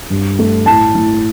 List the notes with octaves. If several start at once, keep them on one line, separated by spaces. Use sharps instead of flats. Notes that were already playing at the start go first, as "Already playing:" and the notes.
G2
A3
A2 A5
A2